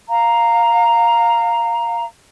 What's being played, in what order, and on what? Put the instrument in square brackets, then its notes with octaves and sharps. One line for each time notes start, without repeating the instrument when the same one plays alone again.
[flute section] F5 A#5